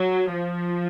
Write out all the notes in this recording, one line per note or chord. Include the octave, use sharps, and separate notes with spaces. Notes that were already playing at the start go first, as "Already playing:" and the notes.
Already playing: F#3
F3